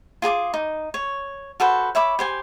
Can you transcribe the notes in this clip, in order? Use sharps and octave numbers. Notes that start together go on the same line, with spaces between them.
F4 G#4 A5 D6
D#4
C#5
F#4 A4 B4 C5
C#5 E5 B5 D6
G4 C5 G#5